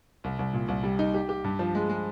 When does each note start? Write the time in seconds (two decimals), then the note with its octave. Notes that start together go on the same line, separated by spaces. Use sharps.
0.24 C2
0.39 C2
0.53 A#2
0.68 C2
0.83 G3
0.99 D#4
1.14 G4
1.29 G4
1.44 G2
1.59 F3
1.75 G#3
1.89 G#3